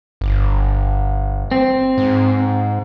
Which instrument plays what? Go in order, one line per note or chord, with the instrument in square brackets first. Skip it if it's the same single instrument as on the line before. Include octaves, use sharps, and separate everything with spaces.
[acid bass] G1
[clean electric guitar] C4
[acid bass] G#2